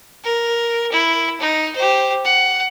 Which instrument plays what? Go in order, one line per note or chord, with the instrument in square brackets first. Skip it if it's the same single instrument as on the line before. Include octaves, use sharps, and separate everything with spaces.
[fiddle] A#4
E4
D#4
G4 C5
F#5